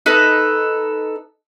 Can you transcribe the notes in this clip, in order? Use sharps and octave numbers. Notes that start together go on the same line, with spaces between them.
D#4 A4 B4